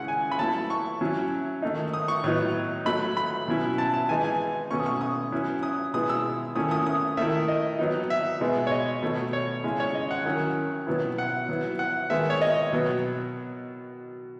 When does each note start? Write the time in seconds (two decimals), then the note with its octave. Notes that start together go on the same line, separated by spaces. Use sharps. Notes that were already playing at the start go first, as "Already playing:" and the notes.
Already playing: C#3 G#3 C#4 E4 F#5
0.08 G#5
0.32 B5
0.39 F#3 A3 E4 A5
0.70 C#6
1.01 F#3 C#4 E4
1.62 D#3 A3 D#4
1.94 D#6
2.08 C#6
2.24 A2 F#3 B3 D#4
2.85 F#3 A3 D#4 B5
3.17 B5
3.48 B2 F#3 C#4 E4
3.78 A5
3.94 A5
4.09 E3 G#3 D#4 G#5
4.24 G#5
4.71 B2 A3 C#4 C#6
4.80 D#6
4.86 C#6
5.01 D#6
5.32 F#3 C#4 E4
5.63 D#6
5.94 B2 G#3 B3 E4 D#6
6.09 E6
6.55 D#3 A3 C#4 E4 D#6
6.71 D#6
6.87 D#6
7.17 D#3 A3 E4 E5
7.48 D#5
7.79 F#3 B3 D#4
8.10 E5
8.41 B2 G#3 B3 D#4
8.67 C#5
8.72 D#5
9.03 B2 A3 D#4
9.33 C#5
9.64 C#3 G#3 C#4 E4
9.80 C#5
9.95 D#5
10.11 F#5
10.25 D#3 F#3 C#4 E4
10.87 B2 F#3 B3 E4
11.18 F#5
11.49 F#3 B3 E4
11.79 F#5
12.10 D#3 G#3 B3 E5
12.30 C#5
12.42 D#5
12.73 B2 F#3 B3